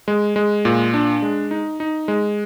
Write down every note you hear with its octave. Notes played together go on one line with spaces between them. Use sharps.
G#3
G#3
A#2
D4
G#3
D#4
D#4
G#3